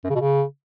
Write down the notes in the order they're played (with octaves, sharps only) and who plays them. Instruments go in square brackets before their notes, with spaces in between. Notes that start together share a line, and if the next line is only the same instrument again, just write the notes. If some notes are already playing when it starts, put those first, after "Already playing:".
[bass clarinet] F#2
C#3
B2
C#3